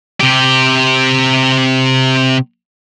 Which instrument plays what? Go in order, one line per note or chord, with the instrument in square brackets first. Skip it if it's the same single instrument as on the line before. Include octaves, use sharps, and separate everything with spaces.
[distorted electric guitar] C3 G4